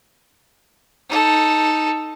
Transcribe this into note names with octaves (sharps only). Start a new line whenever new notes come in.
D#4 A4